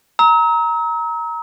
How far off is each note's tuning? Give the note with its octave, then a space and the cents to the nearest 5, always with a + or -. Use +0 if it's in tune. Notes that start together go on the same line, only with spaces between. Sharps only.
A#5 +5 E6 -45